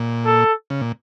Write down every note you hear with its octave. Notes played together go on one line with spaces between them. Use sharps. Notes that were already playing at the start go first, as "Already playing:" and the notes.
Already playing: A#2
A4
C#3
A#2